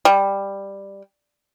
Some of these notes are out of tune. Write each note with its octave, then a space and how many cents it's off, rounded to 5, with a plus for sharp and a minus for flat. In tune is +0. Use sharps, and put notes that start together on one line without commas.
G3 +10